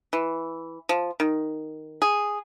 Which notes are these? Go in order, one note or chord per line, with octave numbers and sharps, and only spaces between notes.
E3
F3
D#3
G#4